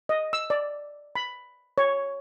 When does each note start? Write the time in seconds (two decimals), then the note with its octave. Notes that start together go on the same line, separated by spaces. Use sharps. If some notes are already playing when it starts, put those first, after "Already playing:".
0.09 D#5
0.33 E6
0.50 D5
1.15 B5
1.78 C#5